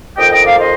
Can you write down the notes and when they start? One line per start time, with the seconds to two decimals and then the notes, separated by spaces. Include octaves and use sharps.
0.17 F2 D#3 D#5 G5
0.31 D#5 G5
0.45 D5 F5
0.59 C5 D#5